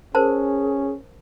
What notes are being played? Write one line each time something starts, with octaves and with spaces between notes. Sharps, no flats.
C#4 G#4 A#4 C5 A5